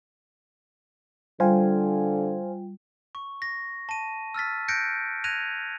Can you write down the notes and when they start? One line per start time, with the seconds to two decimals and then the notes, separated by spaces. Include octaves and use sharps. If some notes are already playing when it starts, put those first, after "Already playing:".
1.40 D3 G3 F4 C5 F5 G5 G#5
3.15 C#6
3.42 A#6
3.89 A5 D#7
4.34 E6 F6 A6 B6
4.68 F#6 G6 A#6 C#7 D7
5.24 F#6 G#6 A#6 D#7 F7